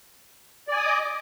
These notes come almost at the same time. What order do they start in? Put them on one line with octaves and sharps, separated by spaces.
D5 G#5 D#6 D6 D#5